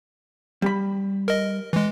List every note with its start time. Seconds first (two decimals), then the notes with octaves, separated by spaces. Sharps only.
0.62 G3 B5
1.28 A#4 D#5
1.73 E3 G#3